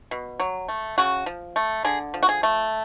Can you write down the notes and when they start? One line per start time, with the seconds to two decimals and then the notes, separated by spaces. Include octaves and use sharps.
0.11 B2
0.40 F#3
0.68 A3
0.98 C#3 F#4
1.26 F3
1.56 A3
1.84 D3 G#4
2.14 F3
2.23 F#4
2.29 G#4
2.43 A3